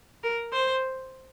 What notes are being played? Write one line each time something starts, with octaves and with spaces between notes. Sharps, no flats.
A#4
C5